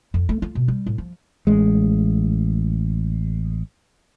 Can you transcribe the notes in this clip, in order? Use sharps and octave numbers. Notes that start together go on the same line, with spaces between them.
F2
A3
F4
B2
G3
A2
F3
A1 G#3